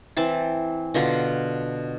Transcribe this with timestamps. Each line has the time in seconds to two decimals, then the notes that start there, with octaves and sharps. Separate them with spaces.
0.17 E3 C4 A5 C6
0.94 B2 D3 F4 C6